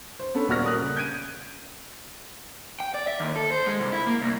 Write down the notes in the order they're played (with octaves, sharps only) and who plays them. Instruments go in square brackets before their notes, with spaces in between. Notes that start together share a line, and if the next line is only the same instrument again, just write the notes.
[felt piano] C5
B3 C#4 A4
D#1 A#2 F#4 D5 F6 A#6
A#4 D#6 F#6
C#3
G6 G#6 D7 D#7
[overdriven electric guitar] G5
D5
E5
D#2
A4
C5
G#3
C2
E4
A#3
C2